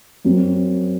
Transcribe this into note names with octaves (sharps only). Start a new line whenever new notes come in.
F#2 F#3 C4